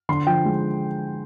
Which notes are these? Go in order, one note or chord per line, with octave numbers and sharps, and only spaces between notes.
D3 C6
F3 G5
G#3